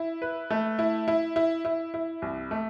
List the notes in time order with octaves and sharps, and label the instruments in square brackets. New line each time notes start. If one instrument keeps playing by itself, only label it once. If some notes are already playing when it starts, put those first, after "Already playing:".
Already playing: [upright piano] E4
B4
A3
E4
E4
E4
E4
E4
C2
A3